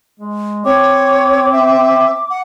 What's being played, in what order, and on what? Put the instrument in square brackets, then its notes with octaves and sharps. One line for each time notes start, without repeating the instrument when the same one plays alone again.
[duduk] G#3
[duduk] C4 [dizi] C#5 [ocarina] D6
[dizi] E5
F#5